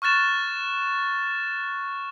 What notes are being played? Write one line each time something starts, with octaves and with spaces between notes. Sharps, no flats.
C#6 F6 F#6 A6 E7